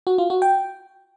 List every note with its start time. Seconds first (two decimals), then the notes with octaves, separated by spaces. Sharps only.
0.07 F#4
0.18 F4
0.30 F#4
0.42 G5